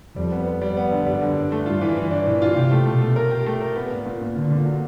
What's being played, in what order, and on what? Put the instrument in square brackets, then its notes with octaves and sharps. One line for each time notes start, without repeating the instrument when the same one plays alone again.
[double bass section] F2 [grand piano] G3
[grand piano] B3
B3
G3
B3
D3
[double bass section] F#2 [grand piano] G3
[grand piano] D3
D4
A3
[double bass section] G2 [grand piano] F4
[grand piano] E3
E3
D4
[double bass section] A#2 [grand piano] E3
[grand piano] F4
[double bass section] C3 [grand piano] G4
[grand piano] A3
[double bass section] B2 [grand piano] A3
[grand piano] A3
A#4
G4
A3
A#4
B3
A#2
A#2
A#2
[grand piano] A#2 [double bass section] D3
[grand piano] A#2
F#3